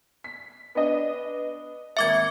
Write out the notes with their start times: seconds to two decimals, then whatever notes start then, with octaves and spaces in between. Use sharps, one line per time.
0.24 B6
0.75 B3 D4 D#5
1.97 G#1 A#3 E5 D6 G#6 C#7